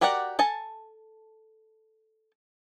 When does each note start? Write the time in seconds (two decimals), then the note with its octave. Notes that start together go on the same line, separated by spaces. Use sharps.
0.01 F#4 G4 A#4 D5 F#5
0.39 A4 G#5 A5